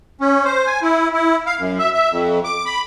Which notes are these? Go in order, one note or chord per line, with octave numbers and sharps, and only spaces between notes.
C#4
C5
G#5
E4
E4
F5
F#2
E5
E5
F2
D6
B5